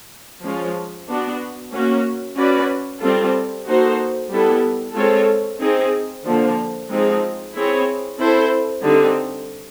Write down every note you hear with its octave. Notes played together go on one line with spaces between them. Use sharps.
F3 G#3 C#4 F4
B3 D4 F#4
A#3 C#4 F#4
C#4 F#4 B4 D5
G3 C4 F4 A4
A#3 D#4 F#4 A4 C5
G3 B3 E4 A4
G#3 C4 F4 A4 C#5
C4 D#4 G#4
D3 F3 A#3 D4
F3 G#3 C4 D#4 G#4
C4 E4 G#4 C#5
C4 E4 A4 C5
D3 G3 C4 D#4